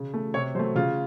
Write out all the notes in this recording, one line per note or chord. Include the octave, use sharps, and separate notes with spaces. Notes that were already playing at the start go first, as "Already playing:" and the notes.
Already playing: C#3
A3
C3 C#5
F#3 A3 C5
C#3 F4